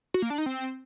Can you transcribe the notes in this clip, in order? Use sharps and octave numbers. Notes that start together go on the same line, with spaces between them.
F#4
A#3
D4
D#4
C4